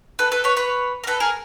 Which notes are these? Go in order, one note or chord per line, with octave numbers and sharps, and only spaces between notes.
A4 B4
A4 B4
B4 C#5
B4 C#5
A#4
A4 B4
G#4 A#4